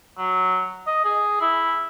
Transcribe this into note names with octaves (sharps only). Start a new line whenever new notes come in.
F#3
D#5
G#4
E4